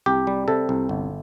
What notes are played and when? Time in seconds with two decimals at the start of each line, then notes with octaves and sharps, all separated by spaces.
0.06 C2 G4
0.27 G3
0.48 C3 A4
0.69 C2
0.89 G1